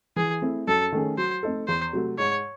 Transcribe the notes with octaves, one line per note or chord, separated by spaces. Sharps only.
E3 G#4
A3 C4 E4
F#2 A4
D#3 A3 C#4 G#4
F#3 C5
A3 C4 D#4 A4
E2 C5
C3 F#3 A3
G#2 C#5